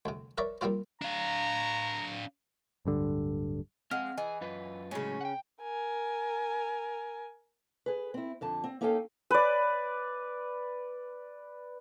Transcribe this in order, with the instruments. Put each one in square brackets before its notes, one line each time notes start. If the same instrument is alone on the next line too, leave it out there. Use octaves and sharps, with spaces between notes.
[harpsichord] D2 C3
A#4 B4 C#5 D5 E5
G3 A#3 C4 F4 C5
[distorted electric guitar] D4 F5 [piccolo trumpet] A#5
[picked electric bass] D1 G2 D3
[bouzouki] G#3 [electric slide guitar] C4 F5 [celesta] F#5 F6
[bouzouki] E3 [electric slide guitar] G#4 [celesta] D#5
[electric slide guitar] F#2 F4 B4
[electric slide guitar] A2 F#3 G#3 [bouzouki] C#3 C#4
[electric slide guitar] F#5 G5
[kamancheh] A#4 G#5
[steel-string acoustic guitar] G#4 B4
C4 E4
F2 D3 A5
C4
A#3 C#4 D#4 A4 F5 G5
[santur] B4 D5